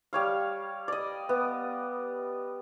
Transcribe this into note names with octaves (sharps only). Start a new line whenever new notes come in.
G3 C#5 F5
D5 D#5
B3